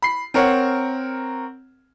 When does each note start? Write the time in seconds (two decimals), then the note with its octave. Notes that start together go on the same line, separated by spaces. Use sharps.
0.02 B5 C7
0.34 C4 A#4 C#5 F#5